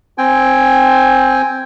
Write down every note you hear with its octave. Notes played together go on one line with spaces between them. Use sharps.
C4 G5 G#5